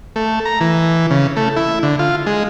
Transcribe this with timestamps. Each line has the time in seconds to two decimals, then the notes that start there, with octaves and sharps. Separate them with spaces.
0.16 A3
0.45 A#5
0.61 E3
1.11 C#3
1.37 A3
1.56 E4
1.83 D3
1.99 F4
2.27 G#3